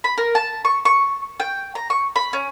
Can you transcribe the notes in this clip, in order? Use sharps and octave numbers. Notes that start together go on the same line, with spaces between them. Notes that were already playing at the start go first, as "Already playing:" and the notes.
B5
A#4
A5
C#6
C#6
G5
A#5
C#6
B5
C#4